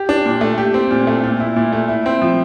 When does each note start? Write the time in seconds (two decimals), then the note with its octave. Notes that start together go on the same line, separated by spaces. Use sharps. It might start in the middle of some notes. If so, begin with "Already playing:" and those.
Already playing: G4
0.09 D4
0.25 A#2
0.41 A3
0.58 G4
0.74 C4
0.91 A#2
1.07 A3
1.23 A#2
1.40 E4
1.56 A#2
1.73 A3
1.89 E4
2.06 C4
2.22 F3